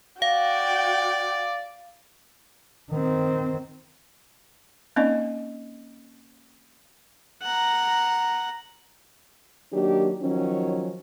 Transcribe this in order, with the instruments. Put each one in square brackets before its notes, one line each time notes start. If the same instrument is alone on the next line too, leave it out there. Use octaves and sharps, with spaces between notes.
[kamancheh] F#4 G5 [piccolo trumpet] D5 [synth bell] F5
[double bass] D#3 C4
[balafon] A#3 C4 C#4 D#4 D5 D#5
[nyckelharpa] F#5 A#5
[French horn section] D#3 F#3 A#3 D4 G4
D#3 F3 F#3 C#4